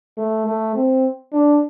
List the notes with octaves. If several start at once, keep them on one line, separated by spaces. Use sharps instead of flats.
A3
A3
C4
D4